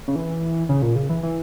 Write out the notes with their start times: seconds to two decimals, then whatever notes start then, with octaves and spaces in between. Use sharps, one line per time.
0.08 C#3
0.16 E3
0.69 C#3
0.82 A#2
0.96 C#3
1.10 E3
1.23 E3